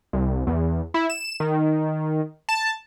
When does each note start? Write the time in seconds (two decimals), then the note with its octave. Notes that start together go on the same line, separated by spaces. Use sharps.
0.13 C2
0.47 E2
0.94 E4
1.10 E7
1.40 D#3
2.49 A5